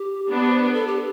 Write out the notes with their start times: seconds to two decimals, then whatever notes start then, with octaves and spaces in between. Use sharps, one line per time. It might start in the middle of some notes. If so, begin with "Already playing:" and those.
Already playing: G4
0.30 B3 D4
0.47 C5
0.61 B4
0.73 A4
0.87 G4